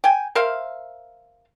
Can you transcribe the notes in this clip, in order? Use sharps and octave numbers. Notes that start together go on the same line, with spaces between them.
G5 G#5
A#4 C5 E5 F5